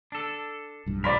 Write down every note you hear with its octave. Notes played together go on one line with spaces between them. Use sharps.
D4 A4
B1 G2
F3 A#4 D5 B5 B6